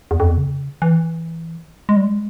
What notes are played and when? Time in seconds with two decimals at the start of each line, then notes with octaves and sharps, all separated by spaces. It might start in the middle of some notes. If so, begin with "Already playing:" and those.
0.11 E2
0.20 F2
0.29 E2
0.38 C#3
0.82 E3
1.89 G#3
1.96 G3
2.04 G#3